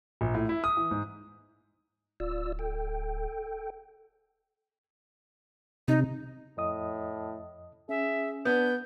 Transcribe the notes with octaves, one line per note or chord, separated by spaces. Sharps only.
A#1
A2
E4
D#6
E3
G#2
D1 F4 D5 E6
A4 G5
C3 D#4
F2 A2 D#5 D#6
C#4 G#4 E5
B3 D4 G6